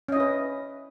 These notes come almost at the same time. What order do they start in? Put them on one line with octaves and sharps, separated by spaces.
C#4 D#5 E4 B4